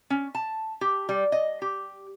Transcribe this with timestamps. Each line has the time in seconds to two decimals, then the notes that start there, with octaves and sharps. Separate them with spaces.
0.10 C#4
0.35 A5
0.81 G4
1.09 G3
1.32 D#5
1.62 G4